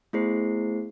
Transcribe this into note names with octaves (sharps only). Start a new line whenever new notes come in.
A3 B3 E4 G#4 C5 C7